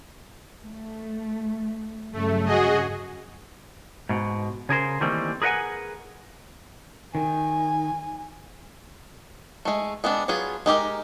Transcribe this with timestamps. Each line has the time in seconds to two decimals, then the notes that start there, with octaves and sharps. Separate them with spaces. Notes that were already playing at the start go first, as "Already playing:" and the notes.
0.65 A3
2.13 G2 C#3 F#3 A3
2.45 F#4 G#4 D#5
4.09 G#2 B2
4.69 C#3 G#4 A#4 C5
5.01 D#3 E3 G3 A3 A#3 C4
5.42 G#4 A#4 B4 D#5 F#5 G#5
7.15 D#3 G#5
9.65 G#3 A3
10.04 G#3 B3 C4 D4
10.28 F#3 B3 F4 G#4
10.66 G#3 D#4 G4 A#4